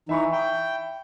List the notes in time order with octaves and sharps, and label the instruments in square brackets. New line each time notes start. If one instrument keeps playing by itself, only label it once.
[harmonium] E3 D#4 [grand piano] E5 B5 C#6
[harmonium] G5